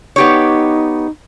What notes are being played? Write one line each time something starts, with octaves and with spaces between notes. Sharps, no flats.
B3 D#4 G4 C#5